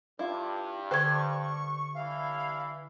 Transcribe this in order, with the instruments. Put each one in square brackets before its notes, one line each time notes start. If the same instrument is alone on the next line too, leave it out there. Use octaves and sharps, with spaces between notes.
[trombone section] G2 [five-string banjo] E4 F4
[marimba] D3 G#6 [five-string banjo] G4 A4 C5 [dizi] C#6
[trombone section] G2 E3 E4 [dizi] F5